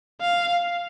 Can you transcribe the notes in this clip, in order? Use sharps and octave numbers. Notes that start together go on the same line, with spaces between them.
F5